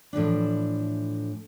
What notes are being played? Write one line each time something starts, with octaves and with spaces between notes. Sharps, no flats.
A2 E3 F3 D4